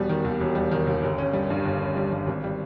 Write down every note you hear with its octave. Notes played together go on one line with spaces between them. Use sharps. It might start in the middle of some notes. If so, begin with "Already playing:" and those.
Already playing: E1 B2 G3
D#3
D#2
E1
G3
D#3
D#2
G1
C#4
G3
G2
G1
C#4
G3
G2
G#1
G3